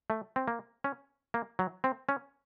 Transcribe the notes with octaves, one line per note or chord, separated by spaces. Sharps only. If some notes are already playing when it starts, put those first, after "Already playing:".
A3
C4
A#3
C#4
A#3
F#3
C4
C#4